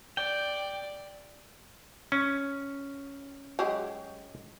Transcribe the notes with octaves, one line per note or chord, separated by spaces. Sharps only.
D5 G5
C#4
F#3 G#3 G4